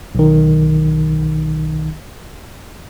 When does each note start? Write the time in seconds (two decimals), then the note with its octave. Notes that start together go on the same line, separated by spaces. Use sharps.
0.15 B1 D#3